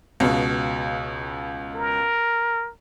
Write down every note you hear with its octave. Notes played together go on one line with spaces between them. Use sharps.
C#2 B2 F5
A#4